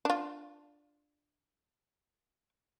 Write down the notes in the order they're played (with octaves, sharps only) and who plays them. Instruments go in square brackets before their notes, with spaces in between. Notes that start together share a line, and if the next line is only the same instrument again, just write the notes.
[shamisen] D4 F4